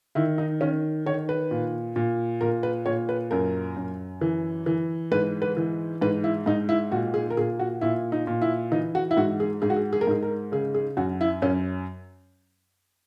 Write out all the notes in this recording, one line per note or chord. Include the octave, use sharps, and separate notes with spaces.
D#3 E4
D#4
D#3 C#4
D#3 C#5
B4
A#2
A#2
A#2 A#4
B4
A#2 C#5
B4
F#2 A#4
F#2
E3
E3
G#2 B4
B4
E3
G#2 B4
E4
G#2 D#4
E4
A#2 F#4
G#4
A#4
A#2 G#4
F#4
A#2 E4
D#4
A#2
E4
E3 D#4
F#4
E4
G#2 F#4
G#4
G#2 G#4
F#4
G#4
G#4
A#4
G#2 G#4
A#4
C#3 G#4
G#4
F#2 F#4
E4
F#2 C#4